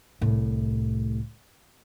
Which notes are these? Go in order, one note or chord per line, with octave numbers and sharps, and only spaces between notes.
C2 A2